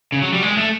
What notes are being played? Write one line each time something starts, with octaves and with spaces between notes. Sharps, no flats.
C#3
F#3
G3
G#3
A3